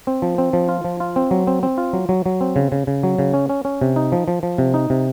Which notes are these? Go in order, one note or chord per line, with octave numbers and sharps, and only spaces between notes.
C4
F3
C4
F3
F4
F3
F4
C4
F#3
C4
C4
F4
F#3
F#3
F#3
C4
C#3
C#3
C#3
F#3
C#3
C#4
C#4
C#4
C3
D#4
F3
F3
F3
C3
D#4
C3